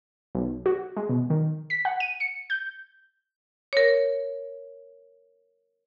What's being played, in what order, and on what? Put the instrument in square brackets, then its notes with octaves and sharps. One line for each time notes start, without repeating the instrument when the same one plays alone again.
[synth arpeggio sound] B1
F#4
G#3
B2
D#3
B6
F#5
D#7
C#7
G6
[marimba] A#4 C#5